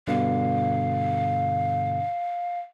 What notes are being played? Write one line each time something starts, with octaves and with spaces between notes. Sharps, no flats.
G2 B2 D3 F5